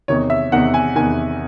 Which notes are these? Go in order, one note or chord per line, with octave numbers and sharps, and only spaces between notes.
E2 C3 D#3 C#5
E5
E2 C3 D#3 F#5
G#5
E2 C3 D#3 G#5